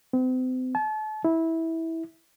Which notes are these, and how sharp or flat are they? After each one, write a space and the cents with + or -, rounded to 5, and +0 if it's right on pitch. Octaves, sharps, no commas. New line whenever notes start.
C4 -40
A5 -35
E4 -15